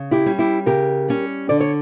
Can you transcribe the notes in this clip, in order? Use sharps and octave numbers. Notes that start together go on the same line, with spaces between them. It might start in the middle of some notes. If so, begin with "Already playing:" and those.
Already playing: C#3
E4 G4
G3 C#4
E4 G4
C#3 G4 A#4
G3 C#4
D3 D5
C#5